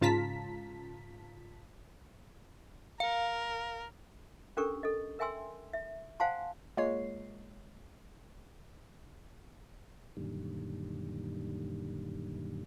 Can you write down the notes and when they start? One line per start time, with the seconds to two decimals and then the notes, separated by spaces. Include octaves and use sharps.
0.01 G#2 C#3 F4 A5 A#5 B6
3.00 A#4 F5
4.57 C#4 D4 G4 A4 A#4 C#6
4.83 A4 D#5
5.19 A#4 E5 G5 G#5 C6 E6
5.73 E5
6.20 C5 F5 F#5 G#5 A5 C6
6.77 G#3 A#3 F4 C#5 C7
10.17 F#2 A#2 D3 D#3 G3